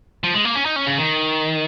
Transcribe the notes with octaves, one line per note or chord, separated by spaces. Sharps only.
F3
G#3
A#3
C#4
D#4
C#4
C#3
D#3